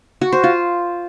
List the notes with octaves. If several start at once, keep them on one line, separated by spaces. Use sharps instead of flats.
F#4
C5
F4